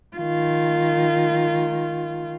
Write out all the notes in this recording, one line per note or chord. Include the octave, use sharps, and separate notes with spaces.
D#3 F4